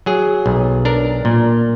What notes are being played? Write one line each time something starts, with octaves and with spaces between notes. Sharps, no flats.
F#3 G#4
B1
D4 A#4
A#2